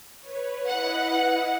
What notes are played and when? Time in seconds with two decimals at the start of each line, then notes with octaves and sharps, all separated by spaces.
0.21 B4 C#5
0.67 E4 B4 D#5 F#5